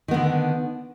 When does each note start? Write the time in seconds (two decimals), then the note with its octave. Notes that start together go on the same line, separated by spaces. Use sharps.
0.08 D#3
0.11 B3
0.14 D3